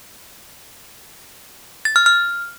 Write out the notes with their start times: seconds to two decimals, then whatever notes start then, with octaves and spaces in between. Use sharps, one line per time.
1.85 A6
1.96 F6
2.06 F6